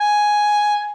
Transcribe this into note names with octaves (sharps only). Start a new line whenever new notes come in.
G#5